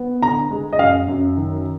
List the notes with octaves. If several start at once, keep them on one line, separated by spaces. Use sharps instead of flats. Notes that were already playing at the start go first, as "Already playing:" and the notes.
Already playing: B3
D3 A#5
G#3
D#5
F#2 F5
F#2
D#3